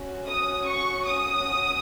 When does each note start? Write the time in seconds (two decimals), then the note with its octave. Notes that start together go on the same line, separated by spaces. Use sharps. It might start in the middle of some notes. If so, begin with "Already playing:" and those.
Already playing: C#4 F#4
0.27 D#6
0.66 C#6
1.06 D#6